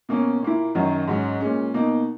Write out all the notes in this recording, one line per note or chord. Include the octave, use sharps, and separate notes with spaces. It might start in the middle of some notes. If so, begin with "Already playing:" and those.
B2 A#3 C#4
A#2 A#3 E4
F#2 D#3 F#3
G#2 F#3 C#4
A#2 G#3 C#4
B2 A#3 D#4